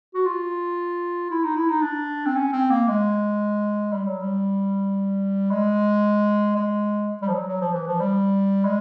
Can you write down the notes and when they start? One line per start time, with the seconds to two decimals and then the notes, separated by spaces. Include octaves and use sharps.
0.14 F#4
0.26 F4
1.31 E4
1.44 D#4
1.56 E4
1.69 D#4
1.82 D4
2.26 C4
2.36 C#4
2.53 C4
2.70 A#3
2.88 G#3
3.93 G3
4.07 F#3
4.21 G3
5.51 G#3
6.56 G#3
7.22 G3
7.28 F3
7.34 F#3
7.48 F#3
7.61 F3
7.74 E3
7.87 F3
8.00 G3
8.65 G#3